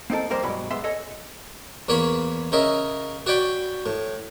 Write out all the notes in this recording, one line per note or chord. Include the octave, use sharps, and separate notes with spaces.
A#3 C4 D#4 A4 A#4
F2 G3 A#3 A#4 C5
G2 B2 F#3 G#3 B5
G#2 B3 E5 C6
G#4 A4 C#5 D#5
E2 A#3 C#5 B5
C#3 C#4 A#4 D#5 E5
F#4 C#5 D5 G5 B5
A2